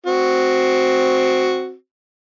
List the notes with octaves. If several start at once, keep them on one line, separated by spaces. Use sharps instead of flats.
C4 F#4